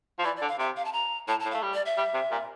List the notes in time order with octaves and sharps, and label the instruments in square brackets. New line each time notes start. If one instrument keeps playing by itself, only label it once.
[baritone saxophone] F3
[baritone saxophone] E3 [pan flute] D5
[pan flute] D5
[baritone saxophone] D3
[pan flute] F5
[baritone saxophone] C3 [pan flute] E5
[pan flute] F5
A5
A#5
[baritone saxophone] A2 [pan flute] A5
[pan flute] A5
[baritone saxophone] A2
[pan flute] F5
[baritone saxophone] A3
G3
[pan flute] D5
E5
[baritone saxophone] G3
C3
A#2